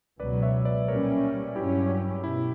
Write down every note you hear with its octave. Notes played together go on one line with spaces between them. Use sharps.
C#2 B2 F#3 B4 D5
C#5 E5
B4 D5
A#2 G3 C#4 A#4 C#5
G2 F#3 C#4 E4 G4
B2 E4